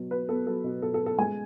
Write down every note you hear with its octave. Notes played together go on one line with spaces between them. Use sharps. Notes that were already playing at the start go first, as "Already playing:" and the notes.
Already playing: B2 F#3
B2 B4
B3 A4
F#3 A4
B2
B2 A4
A4
B3
A4
G#3 G#5